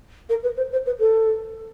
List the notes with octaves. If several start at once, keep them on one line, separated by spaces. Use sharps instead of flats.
A#4
B4
C5
C5
B4
A4